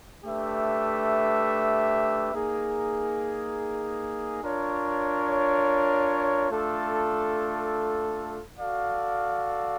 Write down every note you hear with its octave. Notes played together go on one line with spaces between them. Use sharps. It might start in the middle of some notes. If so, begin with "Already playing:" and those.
A3 D4 G4 B4 E5
A#3 D#4 G#4
D4 F4 A#4 C#5
A3 D4 F4 A4
F#4 A4 D5 F5